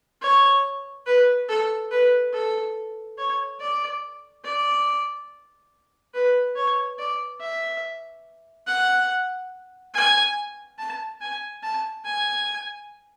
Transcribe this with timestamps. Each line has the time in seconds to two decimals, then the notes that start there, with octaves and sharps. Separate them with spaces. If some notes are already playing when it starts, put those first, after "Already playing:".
0.22 C#5
1.06 B4
1.49 A4
1.91 B4
2.33 A4
3.18 C#5
3.60 D5
4.45 D5
6.14 B4
6.56 C#5
6.99 D5
7.41 E5
8.67 F#5
9.94 G#5
10.79 A5
11.21 G#5
11.63 A5
12.05 G#5